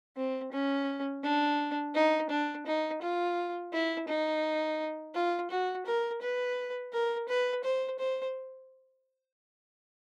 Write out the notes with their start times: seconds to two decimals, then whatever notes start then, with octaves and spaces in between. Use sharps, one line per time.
0.16 C4
0.52 C#4
1.24 D4
1.95 D#4
2.30 D4
2.66 D#4
3.02 F4
3.73 E4
4.08 D#4
5.14 F4
5.50 F#4
5.86 A#4
6.22 B4
6.92 A#4
7.28 B4
7.64 C5
7.99 C5